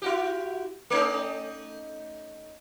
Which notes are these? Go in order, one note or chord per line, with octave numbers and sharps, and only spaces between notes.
E4 F#4 G4
A3 C#4 D#4